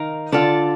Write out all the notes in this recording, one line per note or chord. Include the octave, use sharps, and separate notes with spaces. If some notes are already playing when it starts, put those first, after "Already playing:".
Already playing: D#3 D#4 A#4 F5
D3 F4 A4 D5